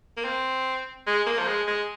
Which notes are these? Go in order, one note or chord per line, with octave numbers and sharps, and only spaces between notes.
A#3
C4
G#3
A#3
F3
G#3
G#3